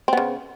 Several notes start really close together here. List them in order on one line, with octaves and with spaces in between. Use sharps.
C4 B3 C#3